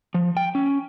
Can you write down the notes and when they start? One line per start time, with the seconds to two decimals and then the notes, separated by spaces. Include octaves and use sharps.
0.14 F3
0.37 G5
0.55 C#4